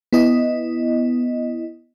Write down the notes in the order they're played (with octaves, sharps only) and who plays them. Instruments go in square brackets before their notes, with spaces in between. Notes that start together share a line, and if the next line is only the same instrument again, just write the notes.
[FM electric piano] B3 E4 D#5